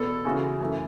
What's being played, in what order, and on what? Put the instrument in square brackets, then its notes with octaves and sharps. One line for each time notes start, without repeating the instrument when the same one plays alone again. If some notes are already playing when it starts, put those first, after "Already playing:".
Already playing: [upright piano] E2 B2 B3 [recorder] A4
[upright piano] C#3 E3 C#4 F#4
F#2 E3 A3 E4